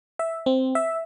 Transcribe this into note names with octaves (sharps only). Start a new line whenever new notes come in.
E5
C4
E5